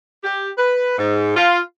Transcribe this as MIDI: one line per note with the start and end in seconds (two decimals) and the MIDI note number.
0.24 0.48 67
0.58 0.97 71
0.98 1.33 44
1.36 1.60 65